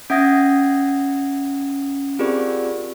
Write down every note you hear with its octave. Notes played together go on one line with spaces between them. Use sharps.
C#4 E5 F#5 D#6 G#6 A#6
C4 F4 G4 G#4 A#4 D5